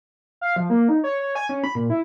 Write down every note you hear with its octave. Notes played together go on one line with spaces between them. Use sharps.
F5
F3
A#3
D#4
C#5
C#5
G#5
C#4
B5
A#2
E4